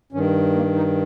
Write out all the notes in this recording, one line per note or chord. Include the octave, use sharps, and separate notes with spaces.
G2 D#3 C#4
A#3
D#4